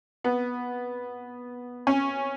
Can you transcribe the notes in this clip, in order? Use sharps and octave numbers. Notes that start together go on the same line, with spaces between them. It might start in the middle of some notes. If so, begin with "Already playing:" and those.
B3
C#4